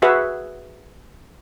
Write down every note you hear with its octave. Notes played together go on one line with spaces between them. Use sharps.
F#4 G#4 B4 E5 F#5